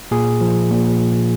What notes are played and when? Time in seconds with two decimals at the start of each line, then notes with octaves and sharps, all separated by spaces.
0.11 A#2 G#4
0.41 F3
0.71 A#2